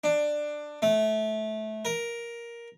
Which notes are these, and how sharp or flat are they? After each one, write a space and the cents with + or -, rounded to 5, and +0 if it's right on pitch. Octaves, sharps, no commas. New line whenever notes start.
D4 +15
A3 -20
A#4 +10